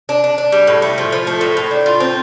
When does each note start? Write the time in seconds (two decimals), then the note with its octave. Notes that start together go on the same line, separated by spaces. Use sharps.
0.09 D4
0.24 D4
0.38 D4
0.52 G3
0.67 A2
0.82 A3
0.98 F3
1.12 F3
1.27 A3
1.41 A2
1.57 A2
1.71 D4
1.86 F4
2.00 C4